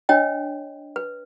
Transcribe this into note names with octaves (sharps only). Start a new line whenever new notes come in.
D4 C#5 D#5 G5
B4